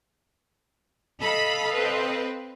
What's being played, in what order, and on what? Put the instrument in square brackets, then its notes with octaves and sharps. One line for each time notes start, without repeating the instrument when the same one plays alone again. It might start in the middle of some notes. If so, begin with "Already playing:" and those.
[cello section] A4 D#5 F5 [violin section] B5
[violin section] C4 B4